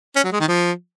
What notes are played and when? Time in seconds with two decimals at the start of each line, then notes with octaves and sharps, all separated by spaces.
0.16 C#4
0.24 F#3
0.32 G#3
0.40 D#3
0.48 F3